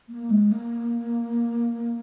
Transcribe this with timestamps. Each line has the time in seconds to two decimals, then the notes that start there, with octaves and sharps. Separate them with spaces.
0.09 A#3
0.30 G#3
0.52 A#3